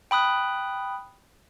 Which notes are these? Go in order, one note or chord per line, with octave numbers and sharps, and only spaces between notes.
G5 B5 D#6 F#6